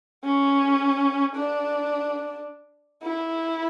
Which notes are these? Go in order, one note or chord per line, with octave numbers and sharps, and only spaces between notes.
C#4
D4
E4